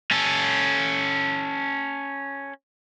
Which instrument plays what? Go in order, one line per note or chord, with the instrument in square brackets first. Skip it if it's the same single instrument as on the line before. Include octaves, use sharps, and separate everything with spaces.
[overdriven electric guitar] C#4 A4